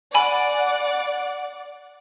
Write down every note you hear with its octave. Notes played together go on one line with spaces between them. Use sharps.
D5 F#5 G#5 B5